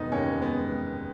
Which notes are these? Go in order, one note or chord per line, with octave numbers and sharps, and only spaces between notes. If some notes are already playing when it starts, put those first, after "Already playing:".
Already playing: F1 G#3 B3 D#4
D#2 A#3 C#4
G#3 B3